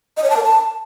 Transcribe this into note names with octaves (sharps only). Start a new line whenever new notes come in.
D#5
C#5
A5
A#4
A5